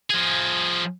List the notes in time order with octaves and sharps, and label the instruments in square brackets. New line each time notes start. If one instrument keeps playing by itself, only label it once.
[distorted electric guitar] F3 G#4